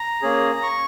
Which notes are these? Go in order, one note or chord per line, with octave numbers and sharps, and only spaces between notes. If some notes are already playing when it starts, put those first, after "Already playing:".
Already playing: A#5
A#3 C#4 G#4
C#6